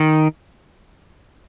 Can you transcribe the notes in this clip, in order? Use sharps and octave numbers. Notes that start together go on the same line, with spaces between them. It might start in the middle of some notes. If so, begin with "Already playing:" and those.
Already playing: D#3